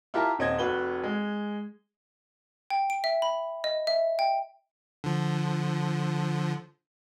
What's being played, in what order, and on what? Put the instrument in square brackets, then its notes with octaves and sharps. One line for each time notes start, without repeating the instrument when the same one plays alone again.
[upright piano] E4 F4 G4 A#4 A5 A#5
D#1 C4 D#5 G#6
F1 F#4 B4 G7
G#3
[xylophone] G5
D7
E5
B5
D#5
E5
G5
[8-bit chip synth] D3 F3